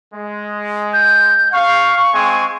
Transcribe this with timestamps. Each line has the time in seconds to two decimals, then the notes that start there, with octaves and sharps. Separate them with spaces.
0.13 G#3
0.93 G6
1.53 F5 C#6
2.14 G#3 C4 G#5